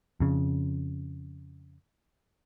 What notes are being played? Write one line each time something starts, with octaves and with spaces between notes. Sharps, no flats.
F2 C#3